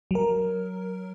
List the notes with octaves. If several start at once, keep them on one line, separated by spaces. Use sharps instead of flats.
F#3 A#4